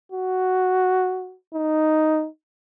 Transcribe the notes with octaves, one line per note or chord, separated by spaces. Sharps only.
F#4
D#4